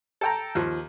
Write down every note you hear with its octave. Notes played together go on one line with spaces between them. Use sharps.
A4 G5 A#5
D#2 F3